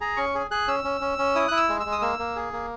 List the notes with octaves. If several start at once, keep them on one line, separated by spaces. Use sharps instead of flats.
G#4 A#5
C#4 C#6
G#4
G#4 F#6
C#4 E6
C#4
C#4
C#4
E4 D#6
E4 F#6
E6
G#3
E6
G#3
D#6
A#3 E6
A#3
G#4
A#3